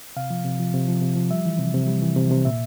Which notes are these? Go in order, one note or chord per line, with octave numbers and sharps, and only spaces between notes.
C3 F5
F3
C3
F3
C3
F3
C3
F3
G3 E5
E3
C3
C3
G3
E3
C3
C3
A#2 E5